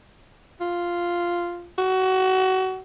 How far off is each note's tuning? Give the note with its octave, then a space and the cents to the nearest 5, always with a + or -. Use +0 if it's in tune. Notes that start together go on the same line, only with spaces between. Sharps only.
F4 -5
F#4 +25